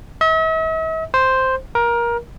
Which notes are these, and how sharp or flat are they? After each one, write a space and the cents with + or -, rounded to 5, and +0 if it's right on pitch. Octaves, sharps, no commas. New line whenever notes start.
E5 -45
C5 +0
A#4 +20